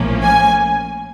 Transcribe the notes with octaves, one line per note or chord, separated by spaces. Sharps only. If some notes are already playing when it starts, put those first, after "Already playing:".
Already playing: A#1 A2 F3 A#3 C#4
G#5